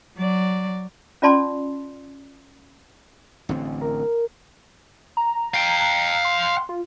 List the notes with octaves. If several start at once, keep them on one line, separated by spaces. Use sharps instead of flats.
F#3 D5
C#4 F4 D5 A5 C6
A1 D3 C4
A#4
A#5
F5 G5
C6
F4